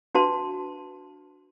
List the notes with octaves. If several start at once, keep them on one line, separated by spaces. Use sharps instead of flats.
D4 F#4 B4 F5 A5 C6